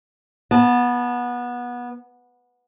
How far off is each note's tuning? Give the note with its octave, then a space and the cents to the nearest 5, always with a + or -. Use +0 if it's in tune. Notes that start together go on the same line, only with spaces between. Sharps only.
B3 -20 A5 +0